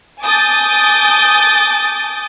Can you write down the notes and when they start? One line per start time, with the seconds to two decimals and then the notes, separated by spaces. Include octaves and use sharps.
0.21 G#5 A5 D6 D#6 G6 A6